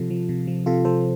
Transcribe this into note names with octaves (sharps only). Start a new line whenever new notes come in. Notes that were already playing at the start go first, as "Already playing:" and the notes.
Already playing: C3 F3 F4 A4
F3
C3
F3
C3 F4 A4
F3 A4 C5